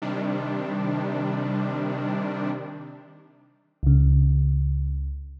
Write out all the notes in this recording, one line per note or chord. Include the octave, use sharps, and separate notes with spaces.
C3 D#3 G3 D4
C#2 C#3